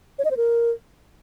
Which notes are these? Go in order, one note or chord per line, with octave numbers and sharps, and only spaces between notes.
C#5
D#5
C5
A#4